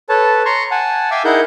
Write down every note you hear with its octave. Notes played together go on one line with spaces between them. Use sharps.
A4 B4 C#5 A5
A#5 C6 C#6
F#5 G#5 A5
E5 F5 G5 G#5 D6 E6
D#4 E4 G#4 A#4 F#5 G6